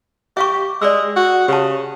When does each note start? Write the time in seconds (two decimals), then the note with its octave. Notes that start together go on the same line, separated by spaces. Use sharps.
0.37 G4 E5 F5 C#6
0.82 G#3 D5 E6
1.16 F#4
1.48 C#3 G4 A5